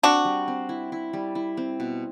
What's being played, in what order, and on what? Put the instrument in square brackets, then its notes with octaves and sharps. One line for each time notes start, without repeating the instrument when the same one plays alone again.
[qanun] C4 [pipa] D4 F#4
[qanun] G3
C4
E4
E4
G3
E4
C4
B2